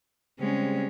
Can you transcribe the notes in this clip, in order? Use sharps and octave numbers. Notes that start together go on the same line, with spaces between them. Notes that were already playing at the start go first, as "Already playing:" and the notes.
C#3 G3 G#3 C4 C#4